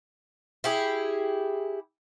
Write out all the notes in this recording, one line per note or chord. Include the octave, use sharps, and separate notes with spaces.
E4 G4 G#4